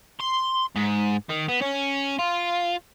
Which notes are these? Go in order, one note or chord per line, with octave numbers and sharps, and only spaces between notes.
C6
G#2
D#3
B3
C#4
F4